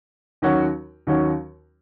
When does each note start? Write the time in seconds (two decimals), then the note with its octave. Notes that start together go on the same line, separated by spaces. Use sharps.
0.42 D#2 D#3 F#3 C#4 F#4
1.07 D#2 D#3 F#3 C#4 F#4